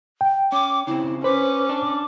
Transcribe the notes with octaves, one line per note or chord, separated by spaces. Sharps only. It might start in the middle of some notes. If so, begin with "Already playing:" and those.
G5
C#4 D6
C#3 C4 E4
C#4 B4 C5 D6
D4